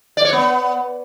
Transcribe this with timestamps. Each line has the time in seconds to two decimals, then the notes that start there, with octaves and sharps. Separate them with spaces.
0.17 D5
0.25 C#5
0.33 B3